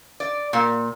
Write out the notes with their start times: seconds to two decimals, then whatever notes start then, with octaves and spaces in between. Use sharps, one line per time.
0.20 D5
0.53 A#2